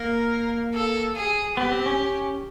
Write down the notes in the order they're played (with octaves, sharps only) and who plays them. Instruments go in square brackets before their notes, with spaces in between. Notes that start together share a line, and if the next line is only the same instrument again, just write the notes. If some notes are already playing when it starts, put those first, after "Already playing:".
Already playing: [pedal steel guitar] A#3 [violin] A#4
[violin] A4
G#4
[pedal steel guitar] B3 [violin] G4
[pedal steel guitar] C4
C#4
C#4